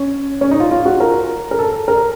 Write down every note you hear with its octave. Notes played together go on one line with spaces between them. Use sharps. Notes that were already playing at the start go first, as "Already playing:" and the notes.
Already playing: C#4
C#4
D#4
F4
F4
F#4
A#4
A#4
A4
A#4